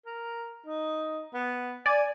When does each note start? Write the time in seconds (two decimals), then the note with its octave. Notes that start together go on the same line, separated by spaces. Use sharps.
0.06 A#4
0.66 D#4
1.34 B3
1.86 D5 G#5